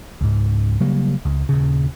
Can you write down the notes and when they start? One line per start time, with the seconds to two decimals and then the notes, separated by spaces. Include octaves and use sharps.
0.21 C#2 G#2
0.81 C#3 F#3 G3 A#3
1.25 C#2
1.49 D#1 C#3